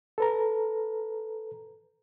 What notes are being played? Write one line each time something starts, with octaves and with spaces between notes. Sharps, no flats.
A4 B4 A#5